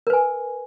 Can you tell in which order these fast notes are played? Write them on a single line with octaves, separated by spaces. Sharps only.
A#4 B4 G#5